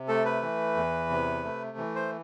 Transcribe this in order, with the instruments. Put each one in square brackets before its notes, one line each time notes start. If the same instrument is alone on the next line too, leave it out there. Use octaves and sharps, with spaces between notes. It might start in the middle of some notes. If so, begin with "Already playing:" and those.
Already playing: [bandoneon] C3
A3 A4
B4
E3
E2
C3
A3
E3
C5